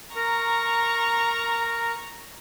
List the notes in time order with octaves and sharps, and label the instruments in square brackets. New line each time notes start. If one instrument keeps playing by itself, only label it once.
[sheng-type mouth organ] A#4 [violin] A#5 C#6